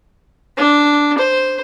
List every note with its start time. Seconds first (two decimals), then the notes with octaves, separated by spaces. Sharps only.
0.57 D4
1.18 C5